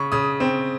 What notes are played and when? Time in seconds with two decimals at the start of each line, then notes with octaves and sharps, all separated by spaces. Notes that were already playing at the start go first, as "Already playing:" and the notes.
Already playing: C#3 C#6
0.12 C#3 D#6
0.40 C4